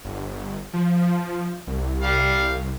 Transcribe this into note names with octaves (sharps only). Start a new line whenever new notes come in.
G1
F3
C2
G3 F5